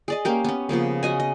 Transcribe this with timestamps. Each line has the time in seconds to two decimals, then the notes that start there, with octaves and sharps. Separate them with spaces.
0.08 G#4 D5 D#5
0.25 A#3 C#4 G4 A#4
0.44 B3 C#4
0.69 C#3 F3 A#3 B3
1.03 F#4 D#5 G#5
1.20 D#5